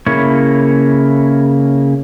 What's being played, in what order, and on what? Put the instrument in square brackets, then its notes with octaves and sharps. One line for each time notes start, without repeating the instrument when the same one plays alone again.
[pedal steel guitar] C#3 A#3 E4 C#5